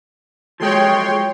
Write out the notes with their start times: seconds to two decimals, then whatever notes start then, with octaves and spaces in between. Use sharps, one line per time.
0.60 F3 F#3 G#3 C#5 G5 C6